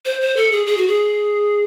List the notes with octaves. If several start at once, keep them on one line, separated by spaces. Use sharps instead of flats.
C5
C5
A4
G#4
G#4
F#4
G#4